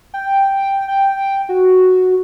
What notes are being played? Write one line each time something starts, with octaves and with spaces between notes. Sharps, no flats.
G5
G5
F#4